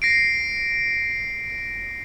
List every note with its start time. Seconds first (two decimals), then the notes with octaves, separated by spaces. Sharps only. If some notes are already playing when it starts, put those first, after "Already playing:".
0.02 A#6 C7 D7